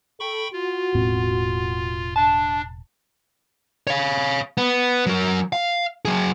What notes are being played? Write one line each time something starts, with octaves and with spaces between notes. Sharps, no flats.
A4 G5 B5 C#6
F4 F#4
E1 A2 C4
D4 A5
C#5 F5
B3
F#3 A#4
F5
F#3 G#4